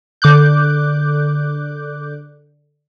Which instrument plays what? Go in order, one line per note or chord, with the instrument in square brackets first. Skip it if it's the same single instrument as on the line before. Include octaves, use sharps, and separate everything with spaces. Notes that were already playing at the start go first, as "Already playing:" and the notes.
[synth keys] D3 D6 F#6 G6